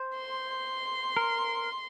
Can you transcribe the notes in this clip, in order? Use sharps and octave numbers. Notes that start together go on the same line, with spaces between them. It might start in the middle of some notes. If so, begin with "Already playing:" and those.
Already playing: C5
C6
A#4